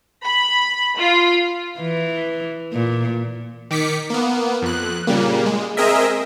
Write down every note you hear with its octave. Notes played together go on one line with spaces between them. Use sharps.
B5
F4
E3
A#2
D#3 D6 B6 C#7
A#3 B3
F2 F#6
A#2 C#3 G3 A#3
G#3
C4 G#4 A#4 D#5 E5